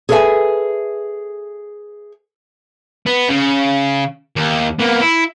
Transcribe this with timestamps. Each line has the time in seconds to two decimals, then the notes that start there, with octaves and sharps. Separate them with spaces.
0.09 G#4 A4 B4 C#5 E5 G#5
3.06 B3
3.29 C#3
4.36 D#2
4.79 A#3 B3
5.01 E4